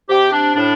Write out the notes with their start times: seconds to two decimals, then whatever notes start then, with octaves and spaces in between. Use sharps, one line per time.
0.09 C3 G4
0.33 D4
0.55 A2 D4